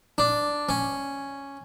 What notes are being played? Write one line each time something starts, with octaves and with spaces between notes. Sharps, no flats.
D4
C#4